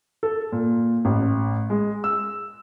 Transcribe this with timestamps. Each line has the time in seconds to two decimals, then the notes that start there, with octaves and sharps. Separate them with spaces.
0.23 A4
0.52 A#2
1.05 A1
1.70 G#3
2.04 E6